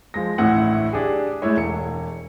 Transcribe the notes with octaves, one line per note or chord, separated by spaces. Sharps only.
F3 G#3 A#6
A1 D2 A2 E4 F#5
D4 G4 G#4
G#3 A3 D4 E4 C#5
E1 C#7